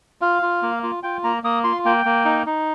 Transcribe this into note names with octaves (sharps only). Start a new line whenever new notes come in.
F4 F5
F4
A#3
F4
F4 G5
A#3 A#5
A#3 D#6
F4 C6
A#3 G5
A#3
D#4
D#4